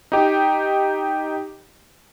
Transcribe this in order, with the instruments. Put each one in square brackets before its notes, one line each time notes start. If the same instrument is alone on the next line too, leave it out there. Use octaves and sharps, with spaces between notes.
[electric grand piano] D#4 G4